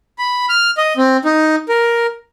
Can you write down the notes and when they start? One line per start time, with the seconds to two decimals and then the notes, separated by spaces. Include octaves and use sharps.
0.18 B5
0.49 F6
0.77 D#5
0.97 C4
1.25 D#4
1.69 A#4